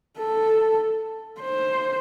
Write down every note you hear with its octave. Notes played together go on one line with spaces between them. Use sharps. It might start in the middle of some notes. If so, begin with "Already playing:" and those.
A4
C5